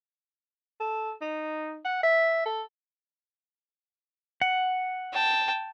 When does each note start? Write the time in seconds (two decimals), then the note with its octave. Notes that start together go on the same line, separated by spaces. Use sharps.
0.80 A4
1.21 D#4
1.85 F#5
2.03 E5
2.45 A4
4.41 F#5
5.13 G5 A5